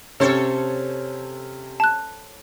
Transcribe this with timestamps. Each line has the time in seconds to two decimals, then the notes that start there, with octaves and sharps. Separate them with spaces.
0.20 C3 C#4 A4 C5 C#5
1.80 A5 F#6